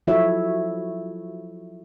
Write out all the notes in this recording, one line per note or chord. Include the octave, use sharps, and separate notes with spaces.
F3 F#3 E4 A4 C#5 E5